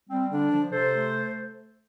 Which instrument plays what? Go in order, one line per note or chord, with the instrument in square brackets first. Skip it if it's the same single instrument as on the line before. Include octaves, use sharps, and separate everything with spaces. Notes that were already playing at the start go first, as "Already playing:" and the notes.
[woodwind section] G3 C4
D3 D4
F3
C3 A4 C5
A3